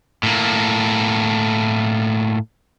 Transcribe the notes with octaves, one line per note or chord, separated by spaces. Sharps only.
A2 A#3